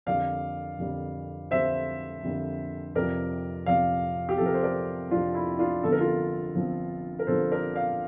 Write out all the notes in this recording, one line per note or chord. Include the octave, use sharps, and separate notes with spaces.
F2 D3 G3 A#3 D5 F5
F2 D3 G3 A#3
F2 D3 G3 A#3 C5 E5
F2 D3 G3 A#3
F2 C3 F3 A#4 D5
F2 C3 F3 D5 F5
G4
F2 C3 F3 A4
A#4
C5
A#4 D5
F2 C3 F3 D4 F4
E4
D4 F4
G1 G2 D3 F3 C4 A4
A#4
F4 A4
G1 G2 D3 F3 C4
A#4
G1 G2 D3 F3 C4 A4 C5
A#4 D5
D5 F5